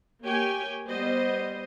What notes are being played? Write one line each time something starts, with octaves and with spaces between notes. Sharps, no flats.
A#3 G4 C#5 G5 G#5
G3 B3 C5 D#5